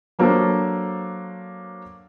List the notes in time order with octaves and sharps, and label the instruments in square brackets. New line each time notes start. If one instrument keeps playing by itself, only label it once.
[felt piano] F#3 A#3 D4 A4 C5